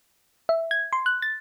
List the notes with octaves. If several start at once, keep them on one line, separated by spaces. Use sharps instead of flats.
E5
G#6
C6
F#6
A6